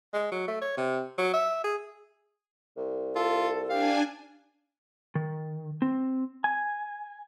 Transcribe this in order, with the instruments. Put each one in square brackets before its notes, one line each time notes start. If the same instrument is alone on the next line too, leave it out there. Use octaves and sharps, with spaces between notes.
[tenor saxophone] G#3
F#3
A3
C#5
C3
F#3
E5
G#4
[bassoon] C2
[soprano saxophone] F4 [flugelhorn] A4
[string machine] D4 G#5 [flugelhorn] G4 [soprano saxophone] F5
[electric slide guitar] D#3
C4
G#5